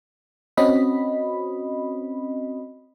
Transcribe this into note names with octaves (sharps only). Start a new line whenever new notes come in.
C4 C#4 F#4 D#5 B5